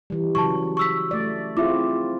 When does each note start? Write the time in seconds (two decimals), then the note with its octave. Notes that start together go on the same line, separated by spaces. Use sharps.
0.10 E3 G3
0.35 C#3 F#3 A5 C#6
0.77 C#6 E6 B6
1.11 A3 D5
1.57 C4 E4 F4 G#4 E5 D6